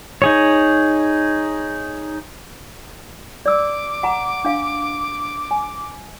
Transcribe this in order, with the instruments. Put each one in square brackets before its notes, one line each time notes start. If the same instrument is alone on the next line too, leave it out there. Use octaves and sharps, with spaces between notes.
[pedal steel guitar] D#4 G#4 C#5
[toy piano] D5 E6 [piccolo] D6
[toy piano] F#5 A#5
D4 F5
G#5